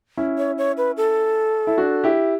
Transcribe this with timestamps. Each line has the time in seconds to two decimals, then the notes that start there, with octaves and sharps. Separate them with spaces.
0.17 C#4 E4
0.38 C#5
0.58 C#5
0.77 B4
0.97 A4
1.67 E4
1.78 D4 F#4
2.04 E4 G4